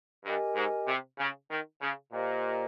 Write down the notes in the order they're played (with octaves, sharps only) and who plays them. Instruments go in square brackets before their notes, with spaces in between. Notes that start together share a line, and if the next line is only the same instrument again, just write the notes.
[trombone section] G2 [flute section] G4 A#4 D#5 G#5
[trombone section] G#2
C3
C#3
D#3
C#3
[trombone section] A#2 [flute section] G4 C5 D#5 A#5